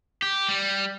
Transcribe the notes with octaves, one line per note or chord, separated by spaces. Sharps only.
G4
G3